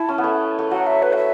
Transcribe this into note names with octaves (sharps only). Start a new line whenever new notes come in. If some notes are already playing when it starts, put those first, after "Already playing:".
Already playing: E4 A5
C#4
B3
A3
A3
F#3 F#5
E5
B4
F#5
E5